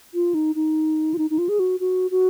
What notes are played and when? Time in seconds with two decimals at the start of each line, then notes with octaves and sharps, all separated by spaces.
0.14 F4
0.34 D#4
0.55 D#4
1.14 F4
1.18 D#4
1.30 D#4
1.38 F4
1.49 G#4
1.59 F#4
1.80 F#4
2.11 F#4